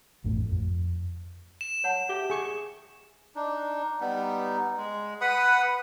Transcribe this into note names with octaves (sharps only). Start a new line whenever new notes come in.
A1 F2 A3
F2
E7
C#5 F#5 A5
G4 E5
G#4 C#6
D4 D#4
G3 B3 D#4
G#3
B4 F#5 B5 D#6